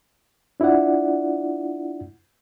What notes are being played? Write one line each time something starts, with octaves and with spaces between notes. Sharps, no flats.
D4 E4 F4 D5 F#5